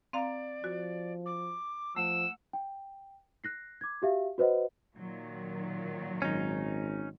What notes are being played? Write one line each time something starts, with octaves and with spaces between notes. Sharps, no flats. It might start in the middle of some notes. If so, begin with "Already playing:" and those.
C4 D5 F5 A#5
F3 F#4
D6
F3 A3 F#5 E6
G5
F#6 A#6 C7
D6 G#6
F#4 G4 E5 F5
F#4 B4 C5 D#5 F#5
A#2 D#3 F#3
G#1 C#4 D#4